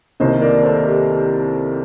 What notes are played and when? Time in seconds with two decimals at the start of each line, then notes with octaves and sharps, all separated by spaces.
0.20 C2 C3 D#3 A#3 C5 D#5
0.41 A#4 D5
0.63 A4 C5
0.85 G4 A#4